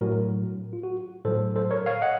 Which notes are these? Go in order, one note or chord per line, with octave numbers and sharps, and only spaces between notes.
A2 F#3 F#4 A#4
F4
F#4
A2 F#3 A4 C5
A4 C5
A#4 C#5
C#5 F5
D#5 F#5